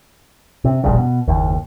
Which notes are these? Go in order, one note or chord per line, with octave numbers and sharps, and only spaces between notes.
C3
E1 A#1 G2 C#3
B2
F#1 D#2